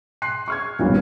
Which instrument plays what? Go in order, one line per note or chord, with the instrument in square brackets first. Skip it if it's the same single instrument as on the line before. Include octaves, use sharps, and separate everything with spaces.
[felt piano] C6 F#6 C7
C#6 F6 G#6
D#1 B1 G2 A#2